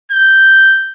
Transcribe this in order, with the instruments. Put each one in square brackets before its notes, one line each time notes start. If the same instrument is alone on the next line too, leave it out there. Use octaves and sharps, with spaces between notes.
[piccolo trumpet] G6